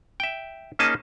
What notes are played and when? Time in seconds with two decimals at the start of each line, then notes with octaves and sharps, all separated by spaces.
0.20 E5 G5
0.79 A#3 C#4 D#4 G#4 D#5 A5